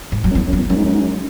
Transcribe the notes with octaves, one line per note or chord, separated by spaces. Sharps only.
G#2
F#3
F#2
E2 G#3
F#2
F#3
E2
F#2 G#3
G#2
F#2
G#2
F#2